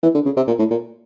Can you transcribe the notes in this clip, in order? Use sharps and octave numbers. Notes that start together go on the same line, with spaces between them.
E3
D3
C#3
C3
A#2
A2
A#2